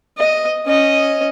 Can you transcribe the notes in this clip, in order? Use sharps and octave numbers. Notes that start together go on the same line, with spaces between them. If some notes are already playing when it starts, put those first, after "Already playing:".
D#5
C#4 D#5